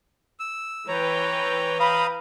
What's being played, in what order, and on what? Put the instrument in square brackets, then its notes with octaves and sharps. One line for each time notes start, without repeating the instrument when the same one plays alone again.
[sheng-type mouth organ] E6
[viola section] E3 B4 G5 [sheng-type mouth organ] C#5 A#5
[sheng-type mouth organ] F5 A#5 D#6 [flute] B5